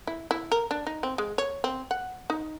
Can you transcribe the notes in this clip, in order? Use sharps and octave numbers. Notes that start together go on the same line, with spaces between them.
E4
E4
A#4
D4
D#4
C4
G#3
C#5
C4
F#5
D#4